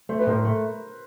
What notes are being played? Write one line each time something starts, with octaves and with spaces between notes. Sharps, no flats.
A3 C5
B4
A2 A#4 C5
A3